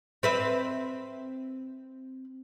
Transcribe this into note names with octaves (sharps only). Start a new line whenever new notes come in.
C4 B4 E5